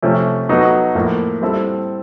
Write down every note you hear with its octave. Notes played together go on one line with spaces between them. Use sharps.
C3 F3 A3 C#4
F#3 B3 D#4 F#4 A4
A2 F3 A#3
G3 C4 E4 A4